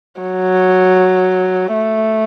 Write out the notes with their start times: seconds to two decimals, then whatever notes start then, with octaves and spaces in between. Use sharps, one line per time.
0.21 F#3
1.74 A3